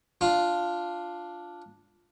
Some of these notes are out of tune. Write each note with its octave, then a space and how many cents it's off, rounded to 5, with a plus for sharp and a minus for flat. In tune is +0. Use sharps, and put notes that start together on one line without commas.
D4 +0 F4 +0